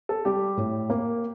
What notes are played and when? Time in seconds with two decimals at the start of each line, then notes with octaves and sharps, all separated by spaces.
0.09 A4
0.25 G3 G4
0.57 A2
0.90 A#3